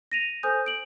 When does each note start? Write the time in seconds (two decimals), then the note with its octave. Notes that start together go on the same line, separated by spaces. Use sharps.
0.12 A#6 D#7 F7
0.43 A4 C5 G#5 D#6 G6
0.66 D7 F#7